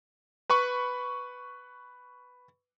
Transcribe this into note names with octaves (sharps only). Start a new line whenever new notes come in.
B4 B5 C#6